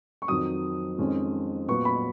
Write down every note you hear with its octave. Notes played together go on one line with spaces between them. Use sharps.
C#6
F2 D#3 F#3 D#6
F2 D#3 G#3 C#4
A#2 F#3 B3 C#6
B5